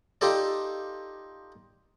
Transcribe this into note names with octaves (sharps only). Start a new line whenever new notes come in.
D#4 F4 G4 A4 D5